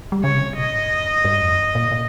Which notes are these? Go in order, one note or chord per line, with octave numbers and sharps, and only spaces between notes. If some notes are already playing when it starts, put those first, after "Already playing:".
G3
C#3 C#5
C3
A#2 D#5
G#2
F2
G2
G2
F2
G2
A#2
A#2